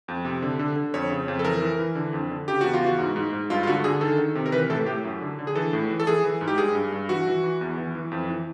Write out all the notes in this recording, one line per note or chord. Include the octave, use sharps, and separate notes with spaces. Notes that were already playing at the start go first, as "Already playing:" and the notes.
F2
C3
D3
D3
D3
F2 C#5
C#3
F2
A4
E3 A#4
E3
E3
D3
F2
D3
C#3 G4
E2 F#4
F4
E3 F#4
G#2
G#2
G#2
G2 F4
F4
D3 F#4
D3 G#4
D#3 A4
D#3
C3
A#4
E3 B4
A2 A4
A2 G4
F#2
D3
D3
G#4
E3 A4
A2
E3
A4
E3 G#4
E3
G#2
G4
G2 G#4
G2
G2
E3 F#4
E3
E3
E2
E3
E3
F2
E3